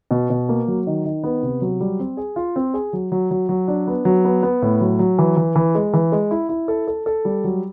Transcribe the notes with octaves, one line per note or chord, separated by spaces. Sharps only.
B2
B2
A#3
F#3
D#3
D#3
B3
C3
F#3
G3
C4
G#4
F4
C4
G#4
F#3
F#3
F#3
F#3
D4
B3
F#3
B3
B3
A2
F#3
F#3
E3
E3
E3
G#3
E3
G#3
E4
E4
A4
A4
A4
G3
F#3